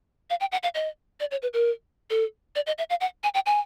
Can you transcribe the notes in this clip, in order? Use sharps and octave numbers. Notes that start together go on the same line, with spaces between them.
F5
G5
F#5
F5
D#5
D5
C#5
B4
A#4
A4
D5
D#5
E5
F5
F#5
G#5
G5
G#5